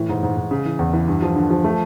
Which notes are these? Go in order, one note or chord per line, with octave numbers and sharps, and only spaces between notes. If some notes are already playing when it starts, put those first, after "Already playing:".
Already playing: A2 E3
G#2
G#2
G#2
C#3
E3
E2
E3
G2
F3
D3
F3
A3